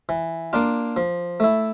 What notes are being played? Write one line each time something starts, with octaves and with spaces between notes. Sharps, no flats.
E3
A#3 D4 F4
F3
A3 E4